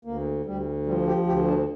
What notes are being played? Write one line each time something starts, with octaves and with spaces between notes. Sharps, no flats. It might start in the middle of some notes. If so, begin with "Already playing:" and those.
D2 A#3
D2 G3
F3 G3
G4
D2 G4
D4